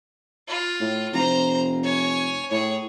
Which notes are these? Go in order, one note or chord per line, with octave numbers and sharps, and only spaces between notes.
F4
A2
F1 C5 A#5
C#5 G#5
A2 G#4 C#5